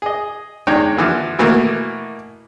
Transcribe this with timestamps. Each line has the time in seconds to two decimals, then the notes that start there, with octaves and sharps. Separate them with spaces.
0.02 G#4 D#5
0.67 E2 G#3 D4 D#4 C#5 G5
0.97 D3 E3 F3
1.39 B2 E3 A3 A#3